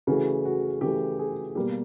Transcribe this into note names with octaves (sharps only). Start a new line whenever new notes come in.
C#3 E3 A3 F#4
F#4
C#3 E3 A3 G4
G#4
B2 G3 A#3 G4